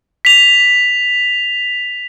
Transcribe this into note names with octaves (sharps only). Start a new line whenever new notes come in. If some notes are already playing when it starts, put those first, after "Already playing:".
B6 F7